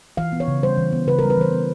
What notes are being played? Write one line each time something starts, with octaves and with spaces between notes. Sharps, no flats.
E3 F5
B3
C#5
C#3
G3 C5
E3
B3
C#3 B4
A#4
G3
B4
E3 C5
B3